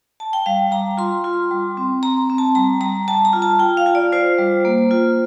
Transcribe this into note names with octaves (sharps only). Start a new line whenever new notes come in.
A5
G5
G3 F5
G3 A#5
F4 C6
F4
G3
C4
C4 A#5
C4
A5
G3 A#5
G3 A#5
G3 A5
A#5
F4
A5
F4 G5
F5
F4
D5
F4 C5
G3
A#3
F4